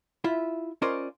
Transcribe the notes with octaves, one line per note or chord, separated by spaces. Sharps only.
E4 F4 E5
C#4 F4 A#4 C5 D5 D#5